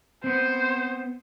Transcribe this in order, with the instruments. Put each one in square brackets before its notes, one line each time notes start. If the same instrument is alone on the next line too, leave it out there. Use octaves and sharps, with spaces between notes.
[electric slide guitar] B3 C4 [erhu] C5